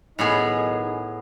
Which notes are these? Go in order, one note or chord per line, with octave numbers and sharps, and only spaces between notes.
B1 A2 D#3 B3 D#4 G#4